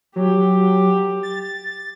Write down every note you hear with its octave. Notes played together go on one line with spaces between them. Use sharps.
F#3 G4
A6